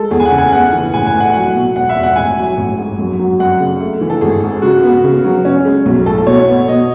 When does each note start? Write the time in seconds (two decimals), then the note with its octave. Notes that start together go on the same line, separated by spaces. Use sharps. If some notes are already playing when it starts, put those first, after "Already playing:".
Already playing: G#3 A4
0.11 E2 G#4
0.20 G#5
0.25 F#5
0.32 C#3
0.38 G#5
0.52 B3 F#5
0.73 E3
0.94 A1 G#5
1.07 G#5
1.13 A2
1.20 F#5
1.34 F#3 F#5
1.55 B2
1.76 E1 F#5
1.89 E5
1.96 E2
2.03 F#5
2.16 A1 G#5
2.37 F#3
2.57 A1
2.78 G#2
2.99 F#2
3.19 F#3
3.40 F#2 F#5
3.60 C#3
3.81 A3
4.01 E3
4.10 A4
4.21 G#1 G#4
4.42 G#2
4.62 C#3 F#4
4.83 B3
5.04 C#3
5.24 F#3
5.45 C#4
5.65 G#3
5.86 B1
6.06 A2 A4
6.27 B2 C#5
6.48 B3
6.68 B2 D#5